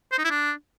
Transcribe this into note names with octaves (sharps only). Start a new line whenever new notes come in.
C5
D#4
E4
D4